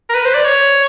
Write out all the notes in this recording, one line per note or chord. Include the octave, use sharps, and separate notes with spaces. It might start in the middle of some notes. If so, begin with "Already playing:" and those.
A#4
B4
C5
D5
C#5